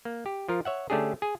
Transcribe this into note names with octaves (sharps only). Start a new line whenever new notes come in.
A#3
G4
F3 F4 A#4
C#5 E5 F#5
D3 A3 C#4 D4 G4 G#4
G#4 G#5